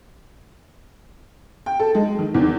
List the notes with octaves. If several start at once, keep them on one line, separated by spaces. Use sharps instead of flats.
G5
A4
G#3
D#3
E2